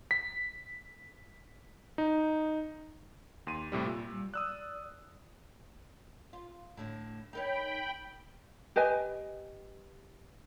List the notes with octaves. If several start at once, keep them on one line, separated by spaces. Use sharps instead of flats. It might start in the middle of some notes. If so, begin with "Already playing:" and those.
B6
D#4
D#2 C6 D#7
A2 C3 G3
A#2 F4
G3
D5 D#6 E6 F#6
F4
A2 D3
D#4 A#4 C#5 G5 B5
G4 B4 D#5 G#5